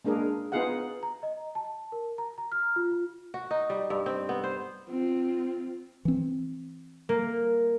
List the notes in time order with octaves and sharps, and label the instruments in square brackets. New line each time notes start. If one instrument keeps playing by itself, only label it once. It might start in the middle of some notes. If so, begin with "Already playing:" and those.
[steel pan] G#3 A#3 D4 G#4 A#4
B3 D#4 F4 G#4 F5 F#5
[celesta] A#5
D#5
A5
A#4
A#5
A#5
F6
F4
F4
[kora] F#4
D#4
G3
G2
C4
B3
C5
[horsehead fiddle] C4 F4
[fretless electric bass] E3 C4
[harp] A#3